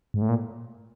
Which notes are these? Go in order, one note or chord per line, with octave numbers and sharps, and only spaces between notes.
G#2
A2
A#2